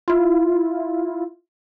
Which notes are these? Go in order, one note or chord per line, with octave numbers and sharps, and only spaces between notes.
E4 F4